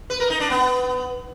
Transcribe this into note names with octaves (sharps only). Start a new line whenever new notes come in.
B4
A#4
D#4
D4
B3